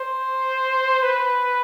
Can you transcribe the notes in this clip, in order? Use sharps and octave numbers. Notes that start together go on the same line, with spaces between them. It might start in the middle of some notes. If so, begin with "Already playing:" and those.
Already playing: C5
B4